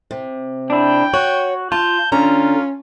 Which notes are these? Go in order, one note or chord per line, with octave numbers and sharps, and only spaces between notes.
C3
D4 E4 G5
F#4 C#5
F4 A5 G6
D3 C#4 F4 A#5